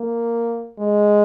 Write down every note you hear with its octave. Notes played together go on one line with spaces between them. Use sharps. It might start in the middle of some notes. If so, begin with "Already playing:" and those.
Already playing: A#3
G#3